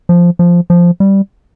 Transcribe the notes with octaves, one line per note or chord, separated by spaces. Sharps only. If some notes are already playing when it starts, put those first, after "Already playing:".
F3
F3
F3
G3